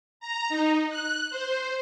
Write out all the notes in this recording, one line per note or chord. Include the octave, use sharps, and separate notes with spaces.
A#5
D#4
F#6
C5